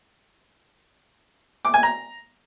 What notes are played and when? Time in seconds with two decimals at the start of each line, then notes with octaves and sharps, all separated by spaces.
1.65 D6
1.74 G#5
1.83 A#5